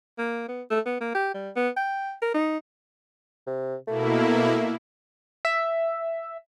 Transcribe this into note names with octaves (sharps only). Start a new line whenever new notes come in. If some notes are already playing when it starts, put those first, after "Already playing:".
A#3
B3
A3
B3
A#3
G4
G3
B3
G5
A#4
D#4
C3
B2 A3 A#3 E4
E5